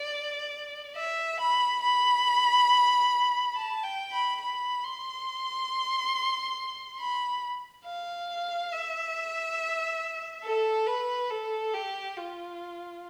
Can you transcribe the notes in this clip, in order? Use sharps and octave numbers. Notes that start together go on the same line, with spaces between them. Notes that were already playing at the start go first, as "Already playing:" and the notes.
Already playing: D5
E5
B5
B5
A5
G5
B5
B5
C6
B5
F5
E5
A4
B4
A4
G4
F4